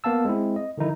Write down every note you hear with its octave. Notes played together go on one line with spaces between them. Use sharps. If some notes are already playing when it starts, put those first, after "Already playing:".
A#3 B3 F5 A5 E6
G#3 C4 E4
D#5
D3 D#3 F3 D#4 E4